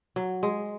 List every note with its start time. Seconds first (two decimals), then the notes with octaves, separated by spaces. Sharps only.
0.16 F#3
0.43 G#3